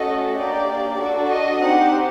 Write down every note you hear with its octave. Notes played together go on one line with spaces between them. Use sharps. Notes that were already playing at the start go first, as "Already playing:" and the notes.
Already playing: A3 C#4 F#4 A4 D#5
A#3 D4 G4 D5
D4 F#4 A4 D5
D#5
C4 D#4 G4 F#5